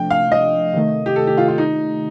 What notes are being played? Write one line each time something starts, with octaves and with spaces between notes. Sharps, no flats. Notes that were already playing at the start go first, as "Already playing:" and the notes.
Already playing: C3 F3 A3 D4 G5
F5
D#5
C3 D#3 A3
G4
A4
G4
F4
F4
D#4